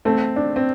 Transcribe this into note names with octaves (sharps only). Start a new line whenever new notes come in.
A3 C4
D4
C4